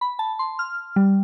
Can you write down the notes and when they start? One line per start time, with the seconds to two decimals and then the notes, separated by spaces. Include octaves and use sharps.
0.01 B5
0.19 A5
0.39 C6
0.59 F6
0.96 G3